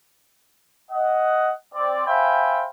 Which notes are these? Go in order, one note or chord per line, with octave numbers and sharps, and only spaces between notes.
D#5 F#5
C4 D5
C5 E5 F5 G5 G#5 B5